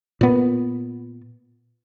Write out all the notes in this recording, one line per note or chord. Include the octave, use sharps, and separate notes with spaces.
A#2 B3